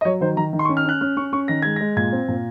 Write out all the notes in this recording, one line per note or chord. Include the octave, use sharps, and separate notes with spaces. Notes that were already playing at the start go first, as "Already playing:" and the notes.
D#5
F#3 C#5
D#3 C5
D#3 A#5
D#3
C6
C#6
C#4
F6
C#4 F#6
C#4 F6
C#4 C#6
C#4 C#6
D#3 A#6
G#3 G#6
A#6
G#3
A#2 G#6
C4
A#2